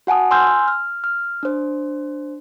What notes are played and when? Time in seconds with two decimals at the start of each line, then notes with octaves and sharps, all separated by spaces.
0.07 F#4 F#5 G#5 A5 D#6
0.31 G#5 C6 E6 F6 G6
0.68 F6
1.04 F6
1.43 D4 C5